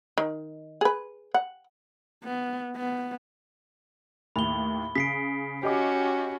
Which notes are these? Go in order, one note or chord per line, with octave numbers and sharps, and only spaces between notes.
D#3
G#4 B4
F#5
B3
B3
D#2 A2 B5 G7
C#3 B6 C7 D7
C#4 F#4 G4 D#5 D6